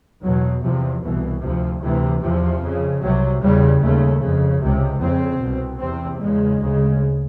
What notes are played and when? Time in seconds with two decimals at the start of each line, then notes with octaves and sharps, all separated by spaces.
0.22 E2 B2 F#3
0.62 E2 C3 F3
1.02 C2 B2 E3
1.42 D2 C3 F3
1.81 D2 C3 E3
2.21 E2 C3 F3
2.61 F2 C#3
3.01 C2 C3 F#3
3.40 E2 C#3 G3
3.80 D#2 C#3 A3
4.21 F2 C#3
4.61 C#2 C3
5.00 F2 C#3 C4
5.40 C2 B2
5.80 E2 C3 C4
6.19 E2 C#3 G#3
6.59 D2 C#3